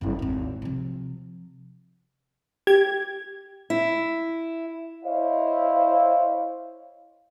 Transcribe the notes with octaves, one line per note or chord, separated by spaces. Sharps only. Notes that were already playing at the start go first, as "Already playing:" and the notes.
F1 E4
G#1 D#2
C3 F3
G4 G#6
E4
E4 C5 C#5 D#5 F5